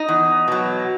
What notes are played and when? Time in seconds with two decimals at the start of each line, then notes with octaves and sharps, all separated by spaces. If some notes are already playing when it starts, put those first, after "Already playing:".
Already playing: D#4 D#5
0.08 E2
0.48 B2 F#3